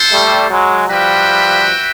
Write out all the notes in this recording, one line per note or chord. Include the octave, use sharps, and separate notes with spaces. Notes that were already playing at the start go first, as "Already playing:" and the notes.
Already playing: F4 A4 C5
G3 A3
F#3 G#3
F3 G3 F#4 B4 E5 G5